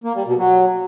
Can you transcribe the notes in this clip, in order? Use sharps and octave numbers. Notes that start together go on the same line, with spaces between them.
A#3
G3
B2
F#3